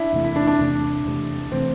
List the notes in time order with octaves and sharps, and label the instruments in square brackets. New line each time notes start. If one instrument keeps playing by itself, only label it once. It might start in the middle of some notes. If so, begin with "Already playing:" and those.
Already playing: [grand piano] D4 E4
[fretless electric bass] E2 C3 A3
[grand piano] E4
D4
D4
[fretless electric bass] E2 C3 A3
E2 C3 A3
[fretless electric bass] C3 E3 A3 [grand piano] C4